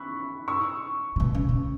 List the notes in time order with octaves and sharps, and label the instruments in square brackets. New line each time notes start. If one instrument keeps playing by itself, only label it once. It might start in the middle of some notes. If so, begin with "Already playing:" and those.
Already playing: [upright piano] B5 C#6 E6 F#6
C#6 E6
[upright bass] C#3
B2
C#3
C#3